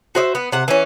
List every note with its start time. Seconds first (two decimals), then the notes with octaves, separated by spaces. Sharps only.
0.15 F#4 C5 D#5 E5
0.35 B3
0.52 C3 F#5
0.68 E3 C#4